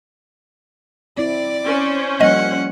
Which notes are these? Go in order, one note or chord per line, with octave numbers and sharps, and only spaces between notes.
C4 E4 D5
C#4 C5
F3 G3 A#3 D#5 F#5